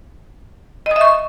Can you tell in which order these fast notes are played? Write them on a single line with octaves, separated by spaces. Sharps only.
D#5 D#6 E5 C#6